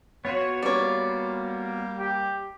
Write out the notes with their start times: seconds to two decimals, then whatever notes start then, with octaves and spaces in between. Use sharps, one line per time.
0.25 B3 F4 F#4 C#5
0.62 G3 A#3 C#5 D5
1.98 G4